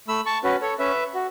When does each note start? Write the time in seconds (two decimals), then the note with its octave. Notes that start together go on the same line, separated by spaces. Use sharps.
0.08 A3 B5 E6
0.26 A5 C#6
0.44 C#4 F#4 B4
0.61 A4 C#5
0.79 C#4 B4 E5
1.15 F#4